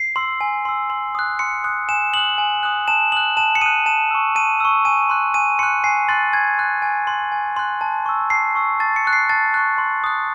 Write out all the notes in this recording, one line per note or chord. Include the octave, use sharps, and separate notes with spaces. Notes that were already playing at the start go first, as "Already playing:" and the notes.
Already playing: C7
C6 E6
G#5
C6 E6
C6
D#6 F#6
C6 C#7
D#6 F#6
G#5 E7
D#6 F#6 F#7
G#5
D#6 F#6
A5 E7
D#6 F#6 F#7
A5 E7
C#7
D#6 F#6 D#7
A5 E7
C#6 E6
A5 D#7
C#6 E6
G#5 D#7
C6 F#6
G#5 D#7
C6 F#6 C#7
G#5 C7
C6 F#6 A6
G#5 G#6
C6 F#6
G#5
C6 F#6
G#5
C6 F#6
A5
C#6 E6
A5 C7
C#6 E6
A5 A6
C#7
C#6 F#6
C7
A5 A6
C#6 F#6
C6
D#6 F#6